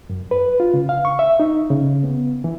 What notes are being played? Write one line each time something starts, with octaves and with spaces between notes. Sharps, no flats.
F#2
B4
F4
C#3
F5
C#6
E5
D#4
C#3
B3
E3